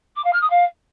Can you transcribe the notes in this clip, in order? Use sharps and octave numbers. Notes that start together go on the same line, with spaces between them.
D6
F5
F6
D#6
F5